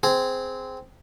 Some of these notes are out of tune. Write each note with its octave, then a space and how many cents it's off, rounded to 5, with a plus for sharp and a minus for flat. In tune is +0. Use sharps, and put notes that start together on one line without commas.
C4 -15 G#4 +0